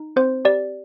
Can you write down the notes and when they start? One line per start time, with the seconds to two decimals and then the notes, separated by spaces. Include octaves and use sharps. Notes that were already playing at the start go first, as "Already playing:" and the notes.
Already playing: D#4
0.16 C4 C5
0.45 G4 D5